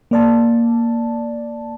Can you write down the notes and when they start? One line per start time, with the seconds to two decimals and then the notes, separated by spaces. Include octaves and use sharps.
0.11 A#3 D5 A5